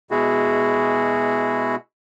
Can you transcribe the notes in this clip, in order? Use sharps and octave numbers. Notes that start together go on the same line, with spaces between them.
B2 G#3 E4 F#4 G#4